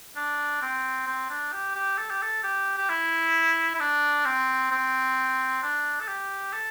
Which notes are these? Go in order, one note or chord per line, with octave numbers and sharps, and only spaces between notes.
D4
C4
C4
D4
G4
G4
A4
G4
A4
G4
G4
E4
E4
D4
C4
C4
D4
A4
G4
A4